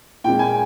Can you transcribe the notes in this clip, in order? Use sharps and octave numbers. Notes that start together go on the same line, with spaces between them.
A#2 G#3 C4 G5
G#5